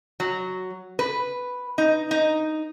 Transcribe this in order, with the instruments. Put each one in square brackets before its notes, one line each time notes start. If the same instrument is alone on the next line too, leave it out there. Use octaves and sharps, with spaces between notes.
[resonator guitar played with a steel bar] F#3
B4
D#4
D#4